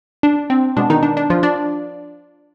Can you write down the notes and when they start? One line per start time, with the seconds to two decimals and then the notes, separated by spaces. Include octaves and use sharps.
0.23 D4
0.50 C4
0.76 B2 G#3 B3 D4
0.90 D#3 D#4
1.03 D4
1.17 D4
1.30 F3 F4
1.43 D4 D5